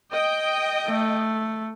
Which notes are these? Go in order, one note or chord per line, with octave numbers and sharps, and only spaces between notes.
D#5 G5
A3